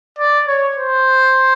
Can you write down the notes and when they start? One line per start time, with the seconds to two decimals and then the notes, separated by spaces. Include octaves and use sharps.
0.19 D5
0.48 C#5
0.78 C5